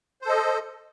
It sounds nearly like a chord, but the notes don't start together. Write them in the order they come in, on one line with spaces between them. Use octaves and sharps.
C5 A4 D#5